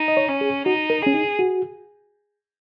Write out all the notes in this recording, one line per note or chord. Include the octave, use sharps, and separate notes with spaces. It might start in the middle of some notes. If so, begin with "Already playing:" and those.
Already playing: D#4
D#5
C#5
C#4
G#4
D#4 F#4
A#4
C#4 G#4
D#4
F#4